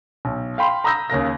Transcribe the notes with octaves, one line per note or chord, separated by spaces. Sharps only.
B1
F5 G5 B5 C6
A#5 B5 D#6 E6 G6 A#6
D#2 C#3 A#4 A#6